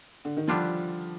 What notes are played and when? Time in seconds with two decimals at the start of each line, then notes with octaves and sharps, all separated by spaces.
0.25 D3
0.37 D#3
0.48 D3 F3 G3 D4 F4